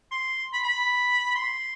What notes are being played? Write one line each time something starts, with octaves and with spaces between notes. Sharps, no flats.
C6
B5
B5
C6